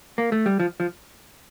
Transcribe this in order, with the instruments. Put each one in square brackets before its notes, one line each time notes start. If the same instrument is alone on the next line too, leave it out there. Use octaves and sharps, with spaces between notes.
[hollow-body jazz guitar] A#3
A3
G3
F3
F3